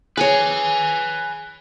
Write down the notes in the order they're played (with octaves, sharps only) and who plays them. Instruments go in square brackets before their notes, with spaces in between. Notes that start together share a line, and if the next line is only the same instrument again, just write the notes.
[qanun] G#4 C#5 [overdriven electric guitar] B4 G#5